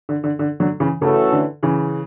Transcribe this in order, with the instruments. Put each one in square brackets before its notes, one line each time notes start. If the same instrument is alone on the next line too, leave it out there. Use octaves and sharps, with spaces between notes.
[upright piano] D3
D3
D3
D3 F#3
C#3 E3
[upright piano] C#3 [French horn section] E3 A3 C#4 F#4 A4
[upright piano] D3
C#3 E3